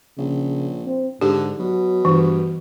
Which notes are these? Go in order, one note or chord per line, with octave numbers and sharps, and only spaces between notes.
A#1 C#3
C4
G#2 D3 G4
B2 F#3
G2 E3